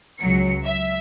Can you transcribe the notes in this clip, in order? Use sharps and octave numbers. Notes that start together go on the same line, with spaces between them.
C#2 F#3 C#7
E5